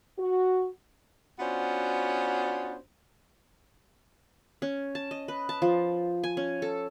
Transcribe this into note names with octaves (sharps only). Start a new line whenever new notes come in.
F#4
B3 C#4 D4 F4 F#4 C5
C#4
A5
D#5
B4
A5
F3
G#5
C#4
A4